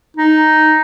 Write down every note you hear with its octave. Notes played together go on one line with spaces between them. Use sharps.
D#4